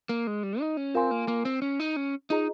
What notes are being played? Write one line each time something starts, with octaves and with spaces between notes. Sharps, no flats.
A#3
G#3
G3
D#4
C#4
C4 F4 A#4 F5 G#5 C6
A#3
A#3
C4
C#4
D#4
C#4
D#4 F4 G#4 D#5 A#5